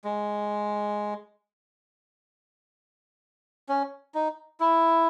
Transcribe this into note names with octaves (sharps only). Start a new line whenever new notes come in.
G#3
C#4
D#4
E4